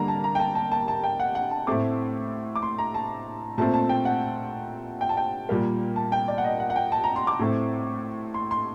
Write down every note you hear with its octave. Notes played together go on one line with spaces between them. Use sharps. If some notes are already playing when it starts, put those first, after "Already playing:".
Already playing: D3 G3 A#3 A#5
A5
A#5
G5
A5
A5
A5
A5
G5
F#5
F#5
A5
A2 A3 C4 D6
D6
C6
A#5
A5
A#2 A3 C4 A5
A5
G5
F#5
G5
A5
G5
A#2 G3 A#3
A5
G5
D5
F#5
D#5
F#5
F#5
G5
A5
A#5
C6
D6
A2 A3 C4
C6
C6